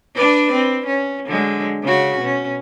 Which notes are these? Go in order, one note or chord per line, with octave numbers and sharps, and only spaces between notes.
D4 B4 D5
C4
C#4
D3 F#3 G#3
C#3 C#4 F#4
B2 C#4